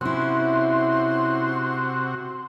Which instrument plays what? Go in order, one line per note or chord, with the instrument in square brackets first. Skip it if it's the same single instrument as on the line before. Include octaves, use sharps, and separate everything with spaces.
[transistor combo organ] C3 F#4 [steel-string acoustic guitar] C#4 E4 [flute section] C6